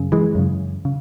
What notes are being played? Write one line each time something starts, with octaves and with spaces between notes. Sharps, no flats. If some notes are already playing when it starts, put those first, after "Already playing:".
Already playing: F#2 C#3
E3 G#3
F#2 C#3
C#3